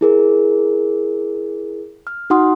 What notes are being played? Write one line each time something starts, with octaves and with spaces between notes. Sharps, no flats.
E4 G#4 A#4
F6
D#4 F#4 F#5 C6 D#6